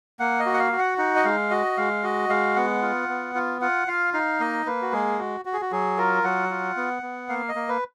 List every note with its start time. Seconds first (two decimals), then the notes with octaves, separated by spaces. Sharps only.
0.20 A#3 F#5
0.40 D#5
0.46 F#4
0.54 F#5
0.59 F5
0.72 F#4
0.78 F#5
0.98 D#4 F#5
1.16 D#5
1.25 G#3 F5
1.50 F#4 D#5
1.77 G#3 F5
2.03 F#4 D#5
2.29 G#3 F5
2.56 B3 F#5
2.82 F4
3.09 B3
3.35 F4
3.61 F4 F#5
3.88 F4 F5
4.14 D#4 F5
4.40 A#3 D#5
4.66 A#3 B4
4.82 F#4
4.93 G#3 G#4
5.19 F#4
5.45 F#4
5.53 G#4
5.61 F#4
5.72 F#3 G#4
5.97 F4 A#4
6.24 F#3 F#5
6.50 F4
6.77 B3
7.03 B3
7.29 A#3 F5
7.49 D#5
7.55 A#3
7.69 B4